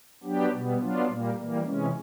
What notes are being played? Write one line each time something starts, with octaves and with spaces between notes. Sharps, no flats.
F#3 B3 D4 G4
B2 G3 B3
F#3 B3 D4 F4
A#2 G3 A#3
E3 G3 A#3
C3 E3 G#3 C#4